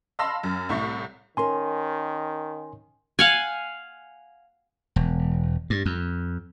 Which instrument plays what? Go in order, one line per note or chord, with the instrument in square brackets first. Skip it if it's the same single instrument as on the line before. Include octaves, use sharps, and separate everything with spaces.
[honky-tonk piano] F5 A5 B5 C6 E6 A#6
F#2
C2 A2 E5 C#6
[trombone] D#3 [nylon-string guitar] C#4 A#4 [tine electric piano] G#5 C6
[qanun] F5 F#5 G#5
[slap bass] E1
G2
F2